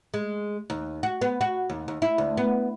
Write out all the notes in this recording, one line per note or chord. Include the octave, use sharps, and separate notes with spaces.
G#3
D#2
F#4
B3
F#4
D#2
D#2
E4
D2
B3